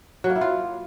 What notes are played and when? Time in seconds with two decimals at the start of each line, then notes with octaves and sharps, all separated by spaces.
0.24 F#3
0.30 A#3
0.36 E4
0.41 F4